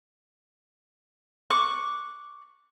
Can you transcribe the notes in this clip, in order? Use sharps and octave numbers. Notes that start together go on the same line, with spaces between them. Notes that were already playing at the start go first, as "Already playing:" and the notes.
C#6 D6 F#6